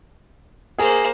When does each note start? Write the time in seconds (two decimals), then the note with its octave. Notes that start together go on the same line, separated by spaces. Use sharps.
0.79 A#3 G#4 C5